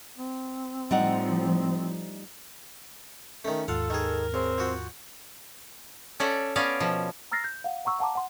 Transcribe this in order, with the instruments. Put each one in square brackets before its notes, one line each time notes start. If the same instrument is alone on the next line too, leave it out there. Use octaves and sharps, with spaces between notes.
[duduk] C4
[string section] A2 F3 [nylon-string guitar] G3 D#4 F#5
[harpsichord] D#3 A3 [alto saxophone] C#4
[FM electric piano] D#2 G#2 [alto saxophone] F4 [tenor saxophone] A4 [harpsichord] F5 F#5
[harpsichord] D#3 G#4 [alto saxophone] A#4
[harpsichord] C#3 [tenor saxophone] C4
[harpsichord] F3 F#4
[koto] C#4 A4 D5 E5 F#5
B3 C#4 D5 F5
B2 F3
[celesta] A#5 E6 F6 A6 A#6 C7
G6
F5 F#5
F#5 A#5 C#6 E6
F5 F#5 A5 A#5 D6
F#5 C6